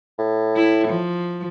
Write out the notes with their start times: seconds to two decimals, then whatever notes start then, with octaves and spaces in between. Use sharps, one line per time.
0.19 A2
0.56 E4
0.87 F3